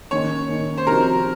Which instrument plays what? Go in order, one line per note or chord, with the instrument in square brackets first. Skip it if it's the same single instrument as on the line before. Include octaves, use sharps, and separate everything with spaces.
[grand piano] D#3 A#3 C#4 [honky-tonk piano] C#5
[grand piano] D#3 A#3 C#4
[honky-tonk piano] C5
[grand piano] C3 F3 C4 D#4 F#4 [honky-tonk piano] A#4